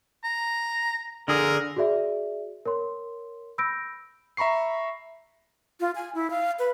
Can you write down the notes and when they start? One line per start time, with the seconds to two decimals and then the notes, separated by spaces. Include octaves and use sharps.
0.24 A#5
1.28 D3 G#4 A#4
1.76 F#4 G#4 D5 E5
2.65 A#4 C#5 C6
3.58 B5 E6 G6 A#6 D7
4.37 E5 A#5 B5 C#6 C7
5.81 F4
5.95 G#5
6.15 E4
6.30 F5
6.59 B4